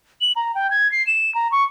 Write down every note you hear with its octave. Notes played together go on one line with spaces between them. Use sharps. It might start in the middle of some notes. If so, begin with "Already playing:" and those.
F#7
A#5
G5
G#6
C7
E7
A#5
C#6